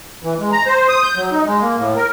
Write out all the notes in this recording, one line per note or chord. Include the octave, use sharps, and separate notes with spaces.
E3
G#3
A#5
C5
D#6
G6
F#3
D#4
G#3
A#3
A2
A#4